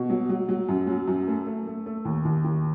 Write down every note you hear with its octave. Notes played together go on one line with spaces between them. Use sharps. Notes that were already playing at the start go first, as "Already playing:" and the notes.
Already playing: B2
F#3
F#3
F#3
F#2
F#3
F#2
A3
A3
A3
A3
D#2
D#2
D#2